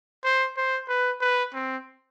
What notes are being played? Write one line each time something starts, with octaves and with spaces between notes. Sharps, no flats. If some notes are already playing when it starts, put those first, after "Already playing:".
C5
C5
B4
B4
C4